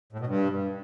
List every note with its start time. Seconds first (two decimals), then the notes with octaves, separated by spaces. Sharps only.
0.13 A2
0.20 B2
0.27 G2